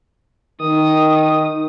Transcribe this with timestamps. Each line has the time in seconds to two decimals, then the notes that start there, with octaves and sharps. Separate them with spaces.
0.61 D#3 D#6